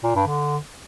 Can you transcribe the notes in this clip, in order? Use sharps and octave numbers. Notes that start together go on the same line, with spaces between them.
A#2
G2
D3